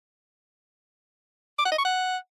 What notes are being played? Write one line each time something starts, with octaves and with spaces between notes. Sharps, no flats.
D6
F#5
D#5
C#6
F#5